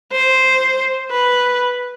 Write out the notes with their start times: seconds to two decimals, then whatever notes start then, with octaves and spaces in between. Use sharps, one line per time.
0.12 C5
1.11 B4